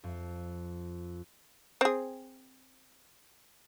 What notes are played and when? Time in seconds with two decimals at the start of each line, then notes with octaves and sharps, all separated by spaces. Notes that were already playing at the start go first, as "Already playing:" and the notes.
0.04 F2
1.81 C4 G#4